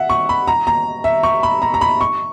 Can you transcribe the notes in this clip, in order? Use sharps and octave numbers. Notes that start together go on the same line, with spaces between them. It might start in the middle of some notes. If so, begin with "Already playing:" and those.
Already playing: E5 F#5
C#6
B5
A#5
A#5
E5
C#6
B5
A#5
A#5
B5
C#6